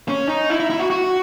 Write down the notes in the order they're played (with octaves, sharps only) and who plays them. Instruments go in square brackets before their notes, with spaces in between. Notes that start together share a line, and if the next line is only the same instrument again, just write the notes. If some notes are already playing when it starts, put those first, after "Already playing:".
[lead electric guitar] C#4
D#4
E4
E4
E4
F#4
F#4